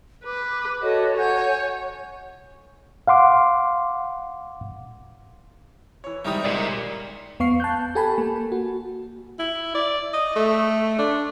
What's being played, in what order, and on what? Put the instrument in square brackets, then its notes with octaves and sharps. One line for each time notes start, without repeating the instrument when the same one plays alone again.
[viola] B4 [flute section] D6
[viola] F#4 [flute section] A4 C#5 D#5
[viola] C#5 [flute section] F#5 G#5 G6
[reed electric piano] F5 F#5 C6 D6
[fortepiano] E3 C#5
[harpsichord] C3 D#3 G#3 [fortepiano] G3 D#4 D#6
[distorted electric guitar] A#4 D5
[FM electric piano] E2 B3 F5 C#6 C7
A5 F#6 G6
G4 A4 G#5 A5 B5
A#3
F#4
[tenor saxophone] E4
D5
D#5
A3
D4